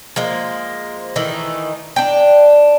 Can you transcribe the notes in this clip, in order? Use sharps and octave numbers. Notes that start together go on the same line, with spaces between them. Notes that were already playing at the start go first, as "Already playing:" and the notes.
F3 G#3 A#3
D#3 E3 A3 D#4
D4 G5